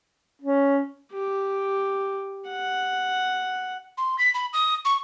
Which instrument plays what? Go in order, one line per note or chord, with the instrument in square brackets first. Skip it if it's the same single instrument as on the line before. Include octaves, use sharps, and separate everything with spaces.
[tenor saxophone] C#4
[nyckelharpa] G4
F#5
[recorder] C6
B6
B5
D#6
C#6